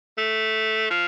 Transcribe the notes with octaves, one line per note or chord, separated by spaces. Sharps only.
A3
F3